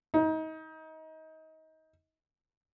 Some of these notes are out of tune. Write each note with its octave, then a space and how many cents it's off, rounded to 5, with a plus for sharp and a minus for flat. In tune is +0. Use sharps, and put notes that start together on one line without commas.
D#4 +30